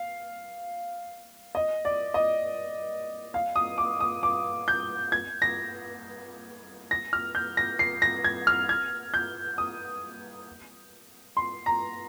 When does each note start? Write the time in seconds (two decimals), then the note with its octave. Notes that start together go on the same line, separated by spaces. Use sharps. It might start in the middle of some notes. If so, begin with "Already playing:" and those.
Already playing: F5
1.55 D#5
1.85 D5
2.14 D#5
3.34 F5
3.56 D#6
3.78 D6
4.00 D#6
4.23 D6
4.68 G6
5.12 G#6
5.42 A#6
6.91 A#6
7.13 F6
7.35 G6
7.57 A#6
7.79 C7
8.02 A#6
8.24 G#6
8.47 F6
8.69 G#6
9.14 G6
9.58 D#6
11.37 C6
11.66 A#5